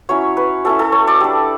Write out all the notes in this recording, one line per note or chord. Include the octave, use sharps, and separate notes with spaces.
F#3 C#4 E4 C#5
B4
F#3 C#4 E4 A4
A4
C#5
D5
G3 D4